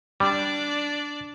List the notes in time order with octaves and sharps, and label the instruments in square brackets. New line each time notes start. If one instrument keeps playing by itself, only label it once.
[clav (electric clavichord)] G3 [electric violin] D4 D5